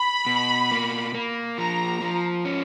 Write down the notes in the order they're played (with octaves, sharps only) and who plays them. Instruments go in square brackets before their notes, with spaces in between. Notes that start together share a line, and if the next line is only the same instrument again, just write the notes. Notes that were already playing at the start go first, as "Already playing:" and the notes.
Already playing: [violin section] B5
[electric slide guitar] B2
A#3
A#3
[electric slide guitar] F3 [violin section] A#5
[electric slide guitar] F3
C#4